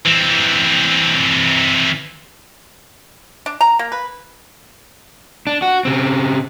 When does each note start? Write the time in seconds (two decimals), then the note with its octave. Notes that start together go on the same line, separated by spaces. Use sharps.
0.05 E3 C4
3.46 D4
3.61 A#5
3.79 A#3
3.92 B4
5.47 D4
5.62 F#4
5.85 C#3 C4